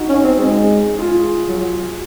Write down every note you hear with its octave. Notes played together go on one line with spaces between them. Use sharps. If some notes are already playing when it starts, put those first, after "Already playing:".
Already playing: D#4 F#4
C#4
C4
G#3
F4 G#4
F#3